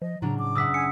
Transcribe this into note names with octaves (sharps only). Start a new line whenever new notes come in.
F3 D#5
A2 C#3 F#3 D4 A#5
D6
F#1 E5 F#5 D#6 E6 B6
G#5 C#7